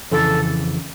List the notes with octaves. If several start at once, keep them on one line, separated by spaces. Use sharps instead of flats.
F2 C#3 E3 A4